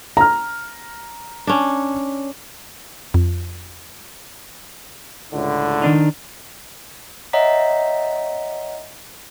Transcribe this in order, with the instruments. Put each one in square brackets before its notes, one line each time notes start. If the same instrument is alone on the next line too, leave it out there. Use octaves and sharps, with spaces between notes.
[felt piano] A#5 F6
[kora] C#4 D4
[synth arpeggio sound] F2
[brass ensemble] C#2 A2 D3
[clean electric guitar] D#3 D4 D#4
[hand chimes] C#5 D#5 E5 F#5 A#5 B6